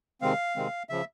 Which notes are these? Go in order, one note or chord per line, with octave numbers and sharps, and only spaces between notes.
C3 D#3 G#3 C4 F5
C3 D#3 G#3 C4
C#3 F3 E5